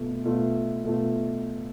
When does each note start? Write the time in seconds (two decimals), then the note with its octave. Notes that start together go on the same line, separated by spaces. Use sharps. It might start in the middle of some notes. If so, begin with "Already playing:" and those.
Already playing: B2 A3 F4
0.25 B2 A3 F4
0.83 B2 A3 F4